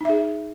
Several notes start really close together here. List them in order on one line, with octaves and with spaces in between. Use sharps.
D#4 E5 G#4